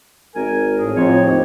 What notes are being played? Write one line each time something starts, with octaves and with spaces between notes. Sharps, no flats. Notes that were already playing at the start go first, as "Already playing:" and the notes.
G#1 A#4 G#5
A2 G#4
F2 A2 F3 C4 C#5
D#2